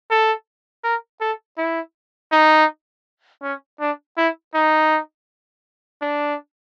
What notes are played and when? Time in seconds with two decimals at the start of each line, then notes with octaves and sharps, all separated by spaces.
0.10 A4
0.84 A#4
1.21 A4
1.58 E4
2.32 D#4
3.43 C#4
3.80 D4
4.17 E4
4.55 D#4
6.02 D4